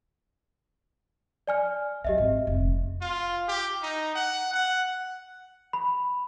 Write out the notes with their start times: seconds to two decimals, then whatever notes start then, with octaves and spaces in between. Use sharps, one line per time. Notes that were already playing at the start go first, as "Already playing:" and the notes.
1.47 D5 G#5 F6
2.04 F3 F#3 G4 D#5 E5
2.18 G#1
2.47 F1
3.01 F4
3.48 G4
3.82 D#4
4.15 F#5
4.53 F#5
5.73 B5